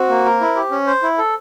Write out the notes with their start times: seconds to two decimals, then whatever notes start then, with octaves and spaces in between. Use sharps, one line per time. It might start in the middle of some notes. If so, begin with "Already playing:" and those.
Already playing: C4 F#4
0.09 A#3
0.25 A#4
0.41 E4
0.56 G4
0.71 C#4
0.87 C5
1.03 E4
1.18 A4